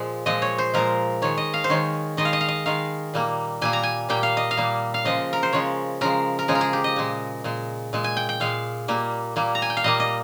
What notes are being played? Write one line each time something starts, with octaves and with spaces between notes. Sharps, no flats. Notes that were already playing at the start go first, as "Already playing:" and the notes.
Already playing: A#2 F3 G#3
A#2 F3 G#3 D#5
C#5
C5
A#2 F3 G#3 A#4
D#3 G#3 C#5
D#5
F5
C5
D#3 G#3 C#5
D#3 G#3 D#5
F5
D#5
F5
D#5
D#3 G#3 F5
A#2 G3 A#3
A#2 G3 A#3 G#5
A#5
G#5
A#2 G3 A#3 G5
F5
D#5
F5
A#2 G3 A#3
F5
C#3 F3 G#3 D#5
A#4
C5
C#3 F3 G#3 C#5
C#3 F3 G#3 A#4
A#4
C#3 F3 G#3 G#4
A#4
G#4
G4
D#5
A#2 G#3
A#2 G#3
A#2 G#3
G#5
G5
G5
A#2 G#3 F5
A#2 G3 A#3
A#2 G3 A#3
A#5
G#5
G5
F5
A#2 G3 A#3 D#5
D#5